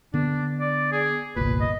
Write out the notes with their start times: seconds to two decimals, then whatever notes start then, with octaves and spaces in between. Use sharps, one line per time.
0.14 D3 B3 D4
0.60 D5
0.92 G#4
1.36 G1 C2 A#2 B4
1.61 D#5